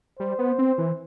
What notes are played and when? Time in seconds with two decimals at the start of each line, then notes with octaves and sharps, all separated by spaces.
0.19 G3 C5
0.39 B3
0.59 C4
0.78 E3